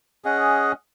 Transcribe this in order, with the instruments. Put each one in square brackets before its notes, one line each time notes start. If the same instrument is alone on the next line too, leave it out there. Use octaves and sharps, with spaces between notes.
[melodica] C#4 G#4 D#5 F#5